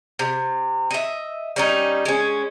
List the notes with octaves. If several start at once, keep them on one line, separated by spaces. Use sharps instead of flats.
C3
D#5 E5
G3 C#4 D#4
G#3 C#4